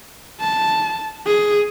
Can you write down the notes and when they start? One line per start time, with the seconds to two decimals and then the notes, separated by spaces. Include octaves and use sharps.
0.40 A5
1.26 G#4